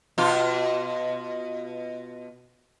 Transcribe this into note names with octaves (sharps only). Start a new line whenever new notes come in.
B2 F4